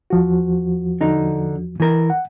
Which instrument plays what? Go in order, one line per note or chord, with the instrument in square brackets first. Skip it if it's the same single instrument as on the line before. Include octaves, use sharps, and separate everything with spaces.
[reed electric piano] E2 F3 F#4
[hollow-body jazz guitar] D3 D#4
E3 A#4
[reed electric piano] F#5